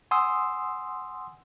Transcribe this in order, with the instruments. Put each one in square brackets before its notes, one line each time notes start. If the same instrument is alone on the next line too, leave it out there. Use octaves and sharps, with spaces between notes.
[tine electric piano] F#5 G#5 C6 D#6 E6